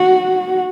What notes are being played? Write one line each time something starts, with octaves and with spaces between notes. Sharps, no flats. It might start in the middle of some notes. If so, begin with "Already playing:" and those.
Already playing: F#4